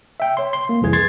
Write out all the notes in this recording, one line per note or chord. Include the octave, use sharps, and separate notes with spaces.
E5 G5
C#5 C6
C6
A#3
C2 F2 E3 G#4 G#6
C6 G#6 A6 C7